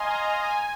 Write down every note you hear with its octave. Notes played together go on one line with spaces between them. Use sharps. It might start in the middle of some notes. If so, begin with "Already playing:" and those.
Already playing: D#5 F5 G#5 A#5 C6
A#5
A#5
G#5